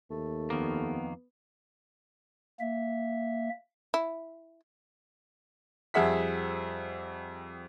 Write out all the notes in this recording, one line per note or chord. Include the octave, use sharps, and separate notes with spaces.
D#2 A3
F2 D#3 A#3 B3
A#3 E5
E4
F2 G3 G#4 E5 F#5 B6